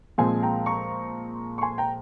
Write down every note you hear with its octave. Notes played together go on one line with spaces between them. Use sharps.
A#2 F3 G#3 C4 F5 G#5
G5 A#5
A#5 C#6
C#6
G#5 C6
G5 A#5